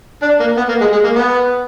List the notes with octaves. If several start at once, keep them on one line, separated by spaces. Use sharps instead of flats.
D4
A#3
B3
A#3
G#3
G#3
A#3
B3